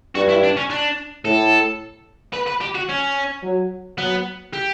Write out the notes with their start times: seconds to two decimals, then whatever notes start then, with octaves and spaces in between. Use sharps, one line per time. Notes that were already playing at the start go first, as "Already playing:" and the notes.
0.15 G2 F#4
0.29 E4
0.44 D4
0.57 C#4
0.70 D4
1.24 A2 A4
2.34 B4
2.48 B4
2.61 G4
2.75 F#4
2.89 C#4
3.43 F#3
3.98 F#3 B3
4.53 G4